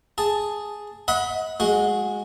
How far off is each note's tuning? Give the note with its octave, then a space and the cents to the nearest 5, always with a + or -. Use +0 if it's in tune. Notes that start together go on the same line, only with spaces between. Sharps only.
G#4 +0 A5 +0
D#5 +35 F#5 -15 B5 +0
G#3 +0 F#4 -20